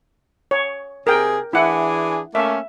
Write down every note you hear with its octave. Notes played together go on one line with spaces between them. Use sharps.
C#5
C3 G#4 A#4 G5
E3 D4 E4 G#4 F#5
A3 A#3 C#4 E5